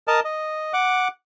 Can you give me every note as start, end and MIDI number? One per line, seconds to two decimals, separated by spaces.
0.08 0.20 70
0.08 0.20 75
0.08 0.20 81
0.25 0.73 75
0.73 1.08 78
0.73 1.08 86